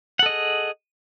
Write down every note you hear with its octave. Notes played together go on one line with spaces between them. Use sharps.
G#4 A4 D#5 F#5